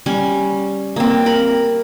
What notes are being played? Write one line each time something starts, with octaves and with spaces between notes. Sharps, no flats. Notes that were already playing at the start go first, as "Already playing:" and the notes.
G3 C#4
A#3 C4
A#4 B5